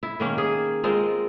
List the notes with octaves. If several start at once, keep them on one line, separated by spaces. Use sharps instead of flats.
E4
D#3 A#3 C#4
G#4
G#3 C4 F4 A#4